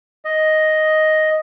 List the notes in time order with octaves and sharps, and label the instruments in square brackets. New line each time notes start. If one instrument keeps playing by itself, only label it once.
[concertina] D#5